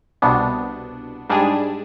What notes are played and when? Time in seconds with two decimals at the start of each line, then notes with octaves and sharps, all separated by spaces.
0.22 C2 B2 B3 D4
1.29 G#2 G3 D4 G#4